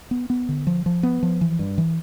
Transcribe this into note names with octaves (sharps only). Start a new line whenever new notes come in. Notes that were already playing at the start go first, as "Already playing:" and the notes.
B3
B3
D3
F3
F3
B3
F3
E3
G2
E3